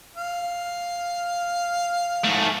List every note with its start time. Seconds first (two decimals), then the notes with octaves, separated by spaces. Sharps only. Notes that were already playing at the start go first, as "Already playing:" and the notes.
0.16 F5
2.24 G#2 A3